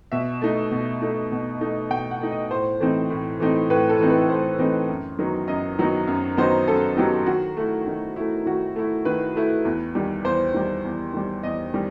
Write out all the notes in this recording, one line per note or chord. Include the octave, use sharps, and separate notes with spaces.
B2 E5
A3 D#4
B2
A3 D#4
B2
A3 D#4
B2 G5
F#5
A3 D#4
D#5
A2 C5
E3 A3 C4 D#4
A2
E3 A3 C4 D#4
A2 B4
A4
E3 A3 C4 D#4
B4
A2 C5
E3 A3 C4 D#4
F#2
D#3 F#3 B3 D#4
F#2 D#5
D#3 F#3 B3 D#4
F#2
D#3 F#3 B3 D#4 C5
F#2 A4
D#3 F#3 B3 D#4 G4
D#3 F#4
A3 E4
D#3
A3 E4
D#3 F#4
A3 E4
D#3 B4
A3 E4
E2
D#3 G3
E2 C5
D#3 G3
E2
D#3 G3
E2 D#5
D#3 G3